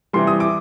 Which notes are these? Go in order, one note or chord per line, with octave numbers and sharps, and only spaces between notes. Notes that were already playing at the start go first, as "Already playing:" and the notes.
C3 E3 G3 C6
D#6
D6